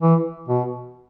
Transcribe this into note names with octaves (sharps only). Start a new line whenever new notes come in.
E3
B2